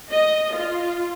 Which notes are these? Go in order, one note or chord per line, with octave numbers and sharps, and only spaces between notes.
D#5
F4